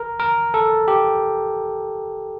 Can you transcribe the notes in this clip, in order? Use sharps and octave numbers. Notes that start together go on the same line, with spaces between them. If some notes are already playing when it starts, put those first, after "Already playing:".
Already playing: A#4
A#4
A4
G4